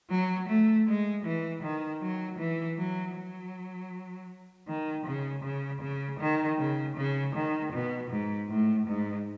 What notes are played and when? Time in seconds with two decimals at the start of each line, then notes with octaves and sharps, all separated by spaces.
0.10 F#3
0.48 A3
0.87 G#3
1.25 E3
1.62 D#3
2.02 F#3
2.38 E3
2.78 F#3
3.16 F#3
4.68 D#3
5.05 C#3
5.44 C#3
5.81 C#3
6.19 D#3
6.58 C#3
6.97 C#3
7.35 D#3
7.73 B2
8.10 G#2
8.49 A2
8.87 G#2